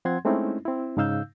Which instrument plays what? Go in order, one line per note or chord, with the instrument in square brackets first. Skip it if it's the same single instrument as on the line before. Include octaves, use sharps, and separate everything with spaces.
[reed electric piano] F3 C4 F#5 C6 G#6
G#3 A3 C4 C#4 D#4 E4
C4 E4
G#2 C#3 D#4 F5 E6 G6